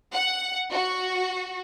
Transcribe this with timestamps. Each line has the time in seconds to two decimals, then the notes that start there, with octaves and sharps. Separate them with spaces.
0.13 F#5
0.72 F#4